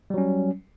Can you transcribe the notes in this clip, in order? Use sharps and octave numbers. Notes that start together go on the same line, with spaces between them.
F#3 G3 C#4